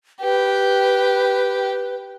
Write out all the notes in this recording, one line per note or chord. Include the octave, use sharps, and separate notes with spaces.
G4 B4